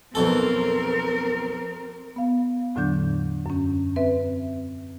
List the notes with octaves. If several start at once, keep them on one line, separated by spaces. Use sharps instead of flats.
B1 F2 C4 A4 A#4
B3 F5
E2 A2 D3 F#3 D4 G6
F#2 C#4
C4 B4 E5